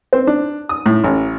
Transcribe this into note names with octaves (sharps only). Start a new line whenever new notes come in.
C4
D4
D#6
A2
A1